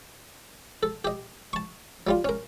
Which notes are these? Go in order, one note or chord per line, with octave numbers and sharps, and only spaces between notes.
A4
G4 D#5
A5 C#6
F#3 G3 F4
C#4 A#4